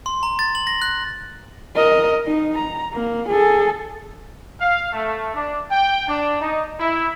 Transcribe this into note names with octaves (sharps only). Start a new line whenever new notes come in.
C6
A#5
A6
F#7
A#6
F#6
A#4 D#5
D#4
A#5
A#3
G#4 A4
F5
A3
D4
G5
D4
D#4
E4